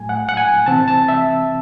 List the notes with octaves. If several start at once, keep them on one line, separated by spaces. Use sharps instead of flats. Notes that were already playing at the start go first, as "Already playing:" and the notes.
Already playing: A2 F#3 A3 G#5
F#5
F#5
G#5
C3 E3 C4 A5
A5
E5